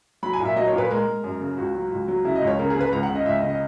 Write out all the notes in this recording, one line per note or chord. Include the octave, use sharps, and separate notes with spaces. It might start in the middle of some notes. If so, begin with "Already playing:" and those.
F#3 B5
G#5
A#2
E5
F#3 D#5
A#2 C#5
B4
G#3 A#4
G#3
F#2
C#3
C#2 F#4
F#3
C#2
F#3
C#3 E4
D#5
C#2
C#5
C#3 A#4
G#4
C#3 B4
C#2 A#5
F#5
C#3
D#5
C#2 E5
D#5
C#3
D#5